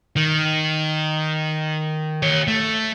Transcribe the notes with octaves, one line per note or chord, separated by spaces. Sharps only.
D#3
G4 C#5
A3